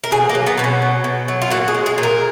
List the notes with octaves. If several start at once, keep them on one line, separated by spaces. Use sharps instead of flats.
A#4
B2 G#4
A#3
F#3
B3
B2 B3
C#4
F#3
B2
F#3
F4
A#2 F#4
G#4
G#3
G#4
A#2
A#4